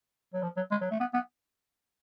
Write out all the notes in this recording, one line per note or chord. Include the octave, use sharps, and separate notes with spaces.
F#3
F3
F#3
G#3
F#3
A3
B3
B3